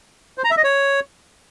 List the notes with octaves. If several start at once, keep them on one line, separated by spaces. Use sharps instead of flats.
C5
A#5
E5
D#5
C#5